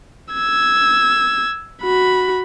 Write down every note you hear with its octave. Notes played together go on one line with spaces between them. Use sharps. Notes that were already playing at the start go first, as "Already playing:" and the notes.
E6 G#6
F#4 B5